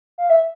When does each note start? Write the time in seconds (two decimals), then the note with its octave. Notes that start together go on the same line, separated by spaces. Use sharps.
0.18 F5
0.30 E5